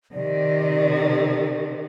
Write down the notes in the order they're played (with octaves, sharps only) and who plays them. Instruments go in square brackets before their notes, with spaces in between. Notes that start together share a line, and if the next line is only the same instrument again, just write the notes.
[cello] C3 D#3 [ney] D5